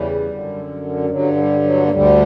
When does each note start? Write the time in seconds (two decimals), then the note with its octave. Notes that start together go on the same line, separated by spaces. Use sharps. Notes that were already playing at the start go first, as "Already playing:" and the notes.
Already playing: E2 C#3 E3 G3
0.28 F#2 D3
1.04 G3
1.09 G2 D3 F#3
1.36 G3
1.64 F#3
1.86 A#3
1.91 D2 D3 G3